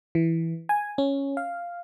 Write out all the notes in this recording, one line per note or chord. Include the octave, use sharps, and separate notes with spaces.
E3
G#5
C#4
F5